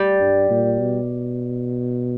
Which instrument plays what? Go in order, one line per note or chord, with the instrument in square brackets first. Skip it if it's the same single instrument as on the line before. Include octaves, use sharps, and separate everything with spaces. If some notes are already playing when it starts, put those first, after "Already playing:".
Already playing: [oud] G3
[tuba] G2
A#2
B2